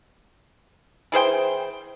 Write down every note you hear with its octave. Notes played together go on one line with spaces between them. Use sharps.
E3 G#4 C5 G5